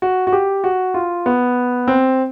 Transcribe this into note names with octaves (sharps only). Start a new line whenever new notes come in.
F#4
F#4
G4
F#4
F4
B3
C4